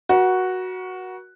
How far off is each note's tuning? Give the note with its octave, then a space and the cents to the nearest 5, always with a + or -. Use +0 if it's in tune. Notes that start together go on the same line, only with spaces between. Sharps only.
F#4 +0 A#4 +45